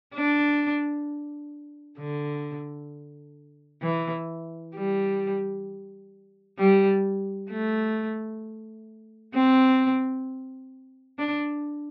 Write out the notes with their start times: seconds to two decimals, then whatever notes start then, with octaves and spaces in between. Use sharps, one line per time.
0.15 D4
1.99 D3
3.83 E3
4.75 G3
6.59 G3
7.51 A3
9.35 C4
11.19 D4